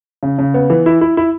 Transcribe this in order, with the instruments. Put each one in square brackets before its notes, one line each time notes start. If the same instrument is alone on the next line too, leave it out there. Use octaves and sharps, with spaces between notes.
[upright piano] C#3
C#3
B3
E3
E4
E4
E4